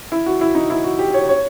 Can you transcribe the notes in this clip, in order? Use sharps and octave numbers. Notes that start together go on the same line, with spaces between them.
E4
F#4
E4
D#4
E4
F#4
G4
C#5
C#5